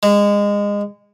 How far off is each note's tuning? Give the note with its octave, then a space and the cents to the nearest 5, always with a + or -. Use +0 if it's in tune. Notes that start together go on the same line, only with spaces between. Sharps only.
G#3 -25